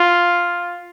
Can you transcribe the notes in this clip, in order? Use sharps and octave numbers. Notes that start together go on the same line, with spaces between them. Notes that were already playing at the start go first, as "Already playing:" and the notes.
Already playing: F4